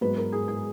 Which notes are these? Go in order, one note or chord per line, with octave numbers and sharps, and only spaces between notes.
G#2 F#3 B3 B4
A#4
G#4
G#4